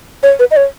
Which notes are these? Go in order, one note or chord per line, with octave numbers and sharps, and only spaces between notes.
C#5
B4
D#5
C#5